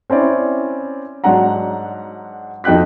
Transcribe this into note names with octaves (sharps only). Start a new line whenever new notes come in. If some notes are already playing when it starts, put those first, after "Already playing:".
C4 C#4 E4 D5
G#2 F#3 D4 F#5 A#5
F2 D#4 G5 F#6 B6